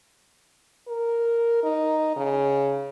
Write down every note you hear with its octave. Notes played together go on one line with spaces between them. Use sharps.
A#4
D#4
C#3